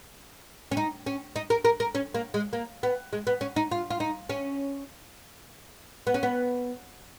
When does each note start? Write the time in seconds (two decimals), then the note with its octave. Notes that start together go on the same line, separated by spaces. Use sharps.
0.71 C#4
0.77 D#4
1.06 C#4
1.36 D#4
1.50 A#4
1.65 A#4
1.80 A#4
1.95 C#4
2.14 A#3
2.34 G#3
2.53 A#3
2.83 B3
3.13 G#3
3.27 B3
3.41 C#4
3.56 D#4
3.71 F4
3.90 F4
4.00 D#4
4.29 C#4
6.07 B3
6.14 C#4
6.23 B3